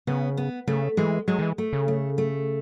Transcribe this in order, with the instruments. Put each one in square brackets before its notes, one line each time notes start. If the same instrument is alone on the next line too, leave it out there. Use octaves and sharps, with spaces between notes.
[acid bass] C#3 [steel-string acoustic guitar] B3
[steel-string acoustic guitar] B3
[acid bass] C#3 [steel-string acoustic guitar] A3
[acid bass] E3 [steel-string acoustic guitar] G#3
[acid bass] F#3 [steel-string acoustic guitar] G#3
[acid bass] D#3
E3
[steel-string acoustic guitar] A3
[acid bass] C#3
[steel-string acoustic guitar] A3
A3